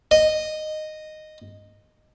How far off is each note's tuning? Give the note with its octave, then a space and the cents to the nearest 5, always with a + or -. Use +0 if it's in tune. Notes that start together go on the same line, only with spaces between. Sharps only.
D#5 -10